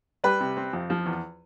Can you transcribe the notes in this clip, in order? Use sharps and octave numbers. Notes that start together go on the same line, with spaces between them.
G3 B4
C3
C4
F2
F3
E2